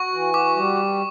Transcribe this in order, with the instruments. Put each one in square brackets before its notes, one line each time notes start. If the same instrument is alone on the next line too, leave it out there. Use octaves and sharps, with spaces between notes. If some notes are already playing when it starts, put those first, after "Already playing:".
Already playing: [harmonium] F#4 [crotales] C#6
[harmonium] E3
[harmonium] F#4 [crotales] D6
[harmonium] G3